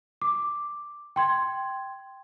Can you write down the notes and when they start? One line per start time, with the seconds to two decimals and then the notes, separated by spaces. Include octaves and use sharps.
0.22 D6
1.16 G5 C6 G#6